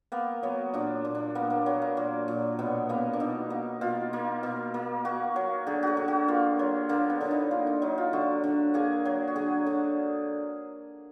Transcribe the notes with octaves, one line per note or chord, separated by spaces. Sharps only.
A#3 B3
F#3 B3
A#2 D4
A#2
D4
A#3 B3
A#3
F#3 B3
A#3
A#2
A#2
B2 B3
A#3 B3
D4
B2 D#4
A#3
B2 F4
A#3
B2
A#3
A#3 F#4
F#3
D3 G#4
F#4 G#4
D3
F#4
A#3 F4
F#3
D3 A#3
B3
D3
D#4
A#3 F4
D#4
F#3 D#4
F4
D3 F#4
D3
A#3 G#4
F#3
F#4
D3 G#4
D3